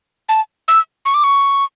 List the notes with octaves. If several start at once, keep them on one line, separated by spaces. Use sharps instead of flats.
A5
E6
C#6
D6
C#6